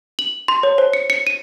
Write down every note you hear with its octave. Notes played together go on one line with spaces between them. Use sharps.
F#7
C6
C#5
C5
C#7
C#7
D#7